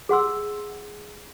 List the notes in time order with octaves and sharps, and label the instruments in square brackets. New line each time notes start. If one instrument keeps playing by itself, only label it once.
[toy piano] G#4 F#5 C6 E6